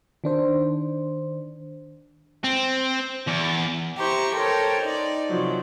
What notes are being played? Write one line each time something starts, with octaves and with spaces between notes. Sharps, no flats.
D#3 D4 C5
C4
E2
E4 G4 C5 A#5 C#6
A4 A#4 C5 C#5 G5
D#4 D5
C3 F3 F#3